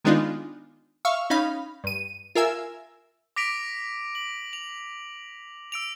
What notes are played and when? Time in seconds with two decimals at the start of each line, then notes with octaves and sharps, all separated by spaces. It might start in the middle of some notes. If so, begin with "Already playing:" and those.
0.05 D#3 G#3 B3 D4 D#4 F4
1.05 E5 F5 C#6
1.30 C#4 D#4 F5 B5
1.84 G2 D#7
2.35 F4 A#4 E5 G#5 E6
3.36 D6 A#6 B6 D7 F7
4.15 F#7
4.53 F7
5.72 E6 D7 F7